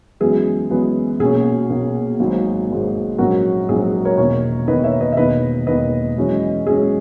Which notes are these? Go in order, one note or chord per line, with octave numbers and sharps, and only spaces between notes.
F#2 E3 G#3 B3 G#4
F#2 E3 G#3 B3
B1 A#2 A#3 C#4 G#4
B1 A#2 A#3 C#4
G#1 G#2 F#3 A#3
G#1 G#2 F#3 A#3
A#1 G#2 F#3 C#4 F#4 A#4
A#1 G#2 F#3 C#4 G#4
G#4
A#4 C#5
E1 E2 D#3 A#3 A#4 C#5
E1 E2 D#3 A#3 B4 D#5
C#5 E5
B4 D#5
E5
E1 E2 D#3 A#3 B4 D#5
E1 E2 D#3 A#3 B4 D#5
F#2 E3 G#3 C#4
F#2 E3 G#3 C#4 G#4